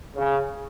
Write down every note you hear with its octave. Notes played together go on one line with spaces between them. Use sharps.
C#3